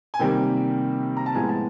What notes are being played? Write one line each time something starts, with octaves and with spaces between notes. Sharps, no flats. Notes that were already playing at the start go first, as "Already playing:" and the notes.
G#5
C3 D#3 G3 A#3 G5
A#5
A5
A2 F3 G#3 B3 G#5
A5